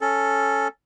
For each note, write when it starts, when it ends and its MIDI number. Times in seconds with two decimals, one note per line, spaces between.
0.01 0.68 61
0.01 0.68 69